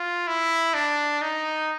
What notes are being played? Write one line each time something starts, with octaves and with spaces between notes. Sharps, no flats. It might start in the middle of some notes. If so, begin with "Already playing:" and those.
Already playing: F4
E4
D4
D#4